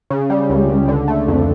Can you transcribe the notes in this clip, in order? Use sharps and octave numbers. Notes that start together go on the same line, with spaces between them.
C#3
G3
C#2
C#2
D3
A3
F2